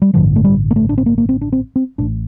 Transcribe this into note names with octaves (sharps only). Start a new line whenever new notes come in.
G3
A1 G2 D3 F3
A3
G3
A#3
A3
D4
C4
A#3
A#3
C4
D4
C4
C4
A1 A2 D4